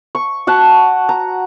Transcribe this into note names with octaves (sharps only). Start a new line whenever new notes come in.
C#6
F#4 F#5 A5
A#5